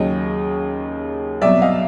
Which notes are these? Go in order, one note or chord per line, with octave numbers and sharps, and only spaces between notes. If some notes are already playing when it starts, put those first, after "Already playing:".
Already playing: D#2 C#3 F#3 C#5 D#5
C2 B2 F#3 D5 E5
D#5 F5